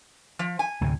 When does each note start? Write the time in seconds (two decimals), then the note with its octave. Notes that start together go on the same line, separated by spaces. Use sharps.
0.39 F3
0.59 G#5
0.81 D2 A2 C3